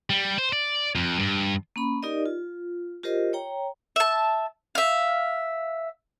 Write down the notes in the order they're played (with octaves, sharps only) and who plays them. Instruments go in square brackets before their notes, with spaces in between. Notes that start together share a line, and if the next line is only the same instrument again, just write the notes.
[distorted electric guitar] G3
C5
D5
F2
G2
[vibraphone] A#3 C#4 B5
D#4 G4 A#4 D5 D#5
F4
F4 G4 A#4 C5 D#5
C#5 G5 A#5
[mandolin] E5 A5
E5 F5